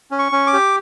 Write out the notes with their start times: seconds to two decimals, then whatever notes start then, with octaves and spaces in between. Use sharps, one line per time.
0.11 C#4
0.19 C#6
0.32 C#4
0.47 D6
0.53 G4